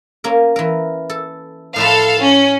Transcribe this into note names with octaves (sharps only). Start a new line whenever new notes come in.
A#3 C#4 A#4
E3 A#4
A4
A2 F3 A4 B4 F5 A5
C#4